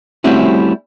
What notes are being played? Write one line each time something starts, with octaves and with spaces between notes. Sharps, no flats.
G3 A3 C4 C#4 E4 F#4